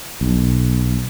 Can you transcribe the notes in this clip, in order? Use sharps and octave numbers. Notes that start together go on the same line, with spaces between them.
B1